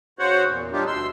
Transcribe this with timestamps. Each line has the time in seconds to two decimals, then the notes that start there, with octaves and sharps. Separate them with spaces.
0.19 C#3 F#4 C5 C#5 F#5
0.48 E2 A#2
0.72 F#3 G3 D4 D#4 F4 G4
0.87 D2 B2 C6 E6